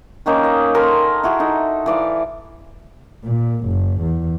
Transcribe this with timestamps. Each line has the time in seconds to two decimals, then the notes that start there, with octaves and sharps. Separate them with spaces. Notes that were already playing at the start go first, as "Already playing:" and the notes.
0.26 D#3 A#3 C#4 D#4
0.44 D#5
0.74 A4 A#4 C5 G#5
1.23 E4 F#4 G#4
1.40 D#4 A4
1.86 E3 D5 F5
3.25 A#2
3.66 F#1
4.01 E2